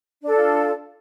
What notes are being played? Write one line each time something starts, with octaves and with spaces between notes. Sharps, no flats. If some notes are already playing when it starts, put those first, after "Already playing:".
D4 F4 A4 D5